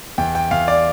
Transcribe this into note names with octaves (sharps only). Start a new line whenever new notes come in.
E2 G5
G5
E2 F5
D5